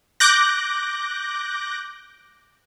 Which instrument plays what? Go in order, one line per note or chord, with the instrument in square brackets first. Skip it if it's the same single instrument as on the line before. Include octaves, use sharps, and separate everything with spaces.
[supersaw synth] D6 F#6 G6 A#6